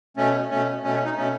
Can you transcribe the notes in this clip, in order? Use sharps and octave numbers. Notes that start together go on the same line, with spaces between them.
B2 A3 C#4
B2 A3 C#4
B2 A3 C#4
C#4
D#4
B2 A3 C#4